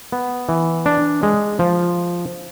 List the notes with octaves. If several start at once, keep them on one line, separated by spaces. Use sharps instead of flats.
B3
E3
D4
G#3
F3